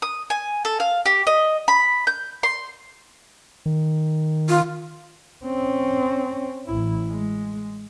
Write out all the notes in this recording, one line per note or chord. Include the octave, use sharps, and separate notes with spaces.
D#6
G#5
A4
F5
G4
D#5
B5
G6
C6
D#3
F4
C4 C#4
A1 E4
G#3